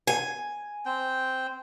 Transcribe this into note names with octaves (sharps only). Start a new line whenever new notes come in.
G#5
C4 G5